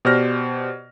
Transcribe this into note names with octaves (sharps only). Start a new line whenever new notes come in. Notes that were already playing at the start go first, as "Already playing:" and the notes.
B2 G4 C5 D5 F6 A#6